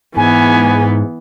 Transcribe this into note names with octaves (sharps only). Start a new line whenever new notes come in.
G#2 E3 B3 G#5